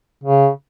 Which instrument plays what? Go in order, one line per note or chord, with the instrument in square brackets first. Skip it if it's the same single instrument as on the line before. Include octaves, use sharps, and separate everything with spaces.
[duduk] C#3